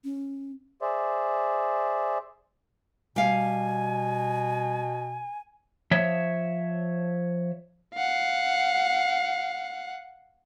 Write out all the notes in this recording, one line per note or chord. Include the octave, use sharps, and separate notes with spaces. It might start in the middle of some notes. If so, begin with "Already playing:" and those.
C#4
G#4 C5 D5 E5
B2 G3 F5 G#5
F3 C#5 E5
F5 F#5